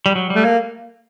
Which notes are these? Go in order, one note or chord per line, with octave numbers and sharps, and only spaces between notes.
G3
F#3
G3
A3
A#3